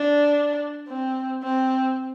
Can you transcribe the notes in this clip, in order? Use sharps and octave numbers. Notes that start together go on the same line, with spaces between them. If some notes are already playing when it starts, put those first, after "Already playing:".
Already playing: D4
C4
C4